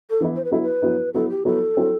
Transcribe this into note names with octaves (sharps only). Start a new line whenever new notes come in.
A4
E3 B3 E4
C5
B4
F#3 B3 E4 A4
B4
F#3 B3 E4
F#3 B3 E4 A4
G4
F#3 B3 E4 A4
F#3 C4 E4